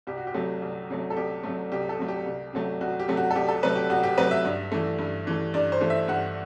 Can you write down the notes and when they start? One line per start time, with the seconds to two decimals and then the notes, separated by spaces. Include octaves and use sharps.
0.07 C2 G4
0.18 F#4
0.27 G4
0.34 C3 F#3 A3
0.62 C2
0.90 C3 F#3 A3
1.10 A4
1.17 C2 G4
1.44 C3 F#3 A3
1.72 C2 G4
1.89 A4
1.98 C3 F#3 A3
2.08 G4
2.26 C2
2.53 C3 F#3 A3
2.81 C2 F#4
2.99 G4
3.08 C3 F#3 A3
3.17 F#4
3.31 A4
3.36 C2 G4
3.49 A4
3.63 C3 F#3 A3 B4
3.76 G4
3.90 C2 F#4
4.03 G4
4.18 C3 F#3 A3 B4
4.31 E5
4.45 G2
4.72 E3 A3
4.99 G2
5.27 E3 A3
5.54 G2 D5
5.72 C5
5.81 E3 A3
5.90 E5
6.08 G2 F#5